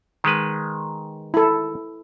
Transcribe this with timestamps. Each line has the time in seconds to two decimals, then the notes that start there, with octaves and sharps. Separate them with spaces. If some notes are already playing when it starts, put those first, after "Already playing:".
0.24 D#3 G#3 B4
1.34 E4 A4